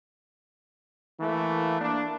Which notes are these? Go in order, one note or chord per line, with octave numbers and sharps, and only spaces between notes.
E3 A3 A#3
A#3 D4